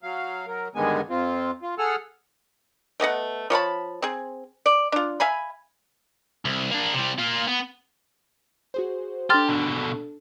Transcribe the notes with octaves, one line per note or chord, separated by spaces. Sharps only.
F#3 F5
F#3 A#4
G2 D3 D#3 G#3 B3 G#5
F2 C4 F4
F4
G#4 A4 F#5 E6 F6
A3 B3 D#5 F#5
F3 C#5 A5 B5
C4 G#4
D5
D4 F4
E5 F5 G#5 B5
C2
A#3 D4
C3 G3
A#3 F4
B3
F#4 G#4 C5
D4 G4 A4 A5 C6 F6 A6
B2 D3